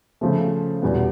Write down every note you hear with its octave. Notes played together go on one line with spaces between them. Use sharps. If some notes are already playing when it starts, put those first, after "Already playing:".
C#3 F3 A3
E2 B2 G3 B3